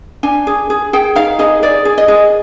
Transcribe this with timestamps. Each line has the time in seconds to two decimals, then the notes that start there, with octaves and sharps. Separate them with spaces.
0.23 D4 G#5
0.47 G#4
0.70 G#4
0.93 G#4 G5
1.15 D#4 F5
1.39 G#4 D#5
1.62 G#4 D5
1.85 G#4
1.98 D#5
2.08 G#4